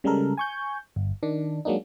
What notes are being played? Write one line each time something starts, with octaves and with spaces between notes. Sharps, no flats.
C#3 G3 G#3 A4 A#4
G#5 C#6 G6
G1
D#3 D4
F#3 G#3 A#3 D4 D#4